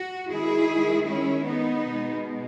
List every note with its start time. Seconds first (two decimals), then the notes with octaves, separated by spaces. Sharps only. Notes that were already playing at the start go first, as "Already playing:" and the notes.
Already playing: F#4
0.29 D#3 G#3 E4 G#4
1.05 C#4 E4
1.44 B3 D#4
1.84 B2 G#3